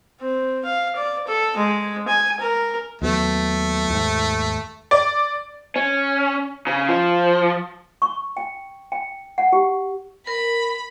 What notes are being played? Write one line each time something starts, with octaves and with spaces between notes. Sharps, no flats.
C4
F5
D5
A4
G#3
G#5
A#4
D#2 F#3 A3 B3
D#2 G#2
D5
C#4
C#3
F3
C#6
G5
G5
F#5
G4
A#4 B5